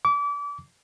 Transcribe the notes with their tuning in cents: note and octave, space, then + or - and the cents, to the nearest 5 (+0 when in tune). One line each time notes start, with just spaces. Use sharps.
D6 -30